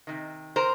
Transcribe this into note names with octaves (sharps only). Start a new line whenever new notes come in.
C3 D#3
A#4 C5